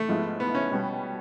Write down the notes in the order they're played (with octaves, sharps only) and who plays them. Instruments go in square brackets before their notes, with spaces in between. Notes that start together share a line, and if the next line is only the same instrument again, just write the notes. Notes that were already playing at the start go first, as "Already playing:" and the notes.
Already playing: [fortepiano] A3
[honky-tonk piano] G#2 F3 G#3 B3 E4
[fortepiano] B3
C#4
[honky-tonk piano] B2 G3 B3